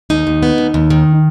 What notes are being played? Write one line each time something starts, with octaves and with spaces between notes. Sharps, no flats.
D#2 D#4
D#2
B3
D#2
D#2
D#3